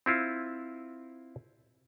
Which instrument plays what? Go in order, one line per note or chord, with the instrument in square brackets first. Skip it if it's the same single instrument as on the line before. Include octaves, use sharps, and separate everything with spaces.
[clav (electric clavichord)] C4 E4 F4